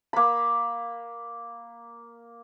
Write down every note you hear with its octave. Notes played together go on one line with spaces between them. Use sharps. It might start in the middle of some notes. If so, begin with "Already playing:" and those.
A#3 B5